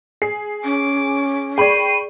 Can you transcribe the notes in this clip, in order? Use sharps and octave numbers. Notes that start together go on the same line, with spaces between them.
G#4 C7
C#4 D6
G#4 D5 G5 B5 C#6 C7 D#7